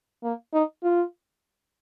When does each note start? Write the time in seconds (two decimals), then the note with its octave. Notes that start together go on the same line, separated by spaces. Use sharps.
0.23 A#3
0.54 D#4
0.83 F4